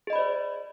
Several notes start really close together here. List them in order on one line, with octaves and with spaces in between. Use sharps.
G#4 D#5 B5 D5 C5